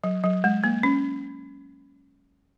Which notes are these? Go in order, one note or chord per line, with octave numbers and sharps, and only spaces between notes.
F#3
F#3
G#3
A#3
C#4